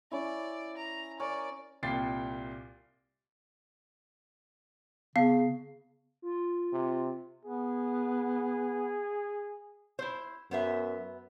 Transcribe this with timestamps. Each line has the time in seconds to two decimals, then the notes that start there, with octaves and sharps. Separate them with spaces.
0.11 C#4 E4 D5
0.77 A#5
1.20 A#4 C#5 D5 G#5
1.83 C2 A#2 G5 A6 C7
5.16 C#3 B3 F5
6.22 F4
6.73 C3
7.45 B3 G#4
9.99 E4 C5
10.51 F#2 B3 C5 E5